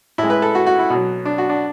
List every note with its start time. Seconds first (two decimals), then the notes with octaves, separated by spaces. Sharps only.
0.18 A2 G#3 E4
0.30 B4
0.42 A4
0.55 F#4
0.66 F#4
0.79 E4
0.90 B2 F#3
1.25 D4
1.38 F#4
1.49 D4